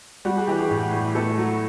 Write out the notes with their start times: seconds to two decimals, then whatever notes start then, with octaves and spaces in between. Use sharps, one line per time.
0.25 G3 F#4
0.37 G#4
0.47 E3 G4
0.59 G#4
0.71 A2
0.93 A2
1.15 A3 A4
1.38 F#3